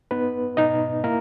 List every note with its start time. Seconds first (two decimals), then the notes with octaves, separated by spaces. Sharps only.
0.11 B3 D#4 B4
0.57 B2 D#4 D#5
1.04 A#3 E4 A#4